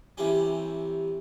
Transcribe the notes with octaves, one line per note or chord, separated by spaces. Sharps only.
C3 E3 G3 C#4